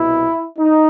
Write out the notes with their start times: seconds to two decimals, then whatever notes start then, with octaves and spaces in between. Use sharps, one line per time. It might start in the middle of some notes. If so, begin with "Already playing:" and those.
Already playing: C2 B2 E4
0.59 D#4